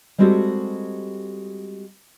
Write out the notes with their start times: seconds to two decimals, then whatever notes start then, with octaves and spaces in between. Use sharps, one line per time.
0.18 G3 G#3 C4 F#4 G4 A4